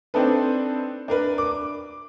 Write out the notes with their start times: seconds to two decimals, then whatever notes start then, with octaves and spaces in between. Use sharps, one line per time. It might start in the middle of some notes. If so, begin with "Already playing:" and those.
0.14 C4 D4 D#4 A4 B4
1.08 D4 A#4 B4
1.38 D6